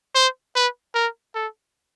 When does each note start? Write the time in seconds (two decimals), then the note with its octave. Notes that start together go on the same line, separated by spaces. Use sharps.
0.15 C5
0.55 B4
0.95 A#4
1.35 A4